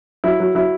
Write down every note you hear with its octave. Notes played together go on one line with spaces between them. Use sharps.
F#3 E4
F#3
F#3 E4